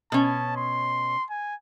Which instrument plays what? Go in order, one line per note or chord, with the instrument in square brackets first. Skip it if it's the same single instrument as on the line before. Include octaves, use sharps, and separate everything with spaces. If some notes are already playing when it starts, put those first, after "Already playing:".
[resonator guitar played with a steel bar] B2 C#4 [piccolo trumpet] A5
[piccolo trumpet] C6
G#5